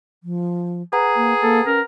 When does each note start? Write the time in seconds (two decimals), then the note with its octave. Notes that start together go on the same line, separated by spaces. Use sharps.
0.24 F3
0.93 G#4 B4 F#5 A#5
1.16 A#3
1.42 A#3 A4
1.66 C#4 A#4